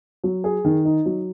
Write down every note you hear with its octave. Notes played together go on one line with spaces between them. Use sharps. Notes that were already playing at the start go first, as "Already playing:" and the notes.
F#3
G#4
D#3
D#4
F#3